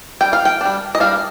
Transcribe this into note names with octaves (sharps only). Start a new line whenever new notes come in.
G3 D4 G5
F5
G5
G3 D4
D#5
G3 D4 F5